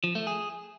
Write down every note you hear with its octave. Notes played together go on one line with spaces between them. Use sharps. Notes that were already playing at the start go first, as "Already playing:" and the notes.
F3
A3
G#4